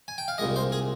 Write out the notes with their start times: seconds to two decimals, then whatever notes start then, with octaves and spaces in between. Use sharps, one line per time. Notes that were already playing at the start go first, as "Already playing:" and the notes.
0.08 G#5
0.18 G5
0.28 F5
0.38 C2 A#2 G#3 D#5
0.56 C5
0.72 G#4